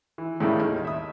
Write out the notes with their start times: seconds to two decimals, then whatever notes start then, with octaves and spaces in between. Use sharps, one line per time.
0.18 E3
0.40 A2 C#3 G3 A3 A#3
0.60 D#2 D#3
0.85 E5 D#6